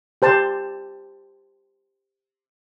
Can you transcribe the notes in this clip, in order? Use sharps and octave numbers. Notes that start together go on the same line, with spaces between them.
G4 C5 A5